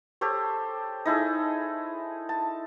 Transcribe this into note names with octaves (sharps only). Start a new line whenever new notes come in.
G4 A4 C5 C#5
D#4 E4 G#4 A4
A5